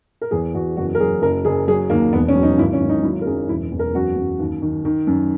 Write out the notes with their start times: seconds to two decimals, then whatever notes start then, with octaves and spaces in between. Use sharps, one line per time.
0.21 A#4
0.31 E2 G#4
0.55 E2 F#4
0.77 F#1 F#4
0.95 A#4
1.00 F#3 G#4
1.22 F#1 A#4
1.45 F#1 G#4
1.68 F#3 G#4
1.90 D#2 A#3
2.13 E1 B3
2.28 C#4
2.36 F#3
2.43 D#4
2.58 G#1 E4
2.73 C#4
2.81 G#1
2.89 D#4
3.03 F#3 E4
3.21 A#4
3.26 F#2 G#4
3.49 E1 E4
3.72 E2
3.79 A#4
3.95 F#2 F#4
4.17 F#2
4.40 D#2
4.62 D#3
4.85 D#3
5.07 F#2